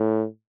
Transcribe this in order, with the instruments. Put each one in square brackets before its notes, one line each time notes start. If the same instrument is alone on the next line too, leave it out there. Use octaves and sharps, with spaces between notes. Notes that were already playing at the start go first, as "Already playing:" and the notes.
Already playing: [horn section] A2